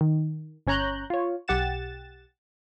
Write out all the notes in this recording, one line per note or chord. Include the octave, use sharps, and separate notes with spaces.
D#3
G1 C#4 C#5 A#5 F#6 G6
F4 C#5
B1 G4 F#5 A6 E7